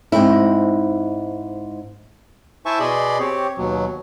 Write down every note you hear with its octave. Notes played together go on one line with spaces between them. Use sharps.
G#2 C4 D#4 E4
E4 C5 E5 G#5 A5 C#6
B2 G#4 D5 D#5 B5 C6
C4 G4 C#5
D#2 B2 F#3